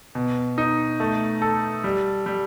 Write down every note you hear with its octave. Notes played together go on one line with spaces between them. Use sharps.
B2
D#4
A3
A4
G3
G3